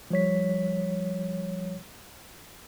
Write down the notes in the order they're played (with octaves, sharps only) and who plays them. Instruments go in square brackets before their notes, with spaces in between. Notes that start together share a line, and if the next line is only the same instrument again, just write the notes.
[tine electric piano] F3 G3 C#5 B6